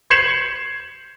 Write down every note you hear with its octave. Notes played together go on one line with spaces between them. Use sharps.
G6 G#6 C7 C#7 E7 F#7